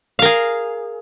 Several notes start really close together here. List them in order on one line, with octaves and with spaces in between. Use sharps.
F5 A#4 G#4